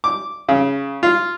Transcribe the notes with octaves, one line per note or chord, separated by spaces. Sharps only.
D6
C#3
F4